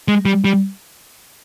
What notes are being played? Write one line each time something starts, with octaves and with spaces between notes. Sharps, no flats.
G#3
G3
G3